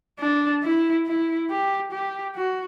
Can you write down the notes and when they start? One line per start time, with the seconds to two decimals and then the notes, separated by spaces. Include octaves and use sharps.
0.20 D4
0.63 E4
1.07 E4
1.50 G4
1.92 G4
2.36 F#4